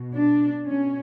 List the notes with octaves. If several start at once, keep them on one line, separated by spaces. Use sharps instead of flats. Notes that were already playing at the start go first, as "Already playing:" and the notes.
Already playing: B2
D4
B2 C#4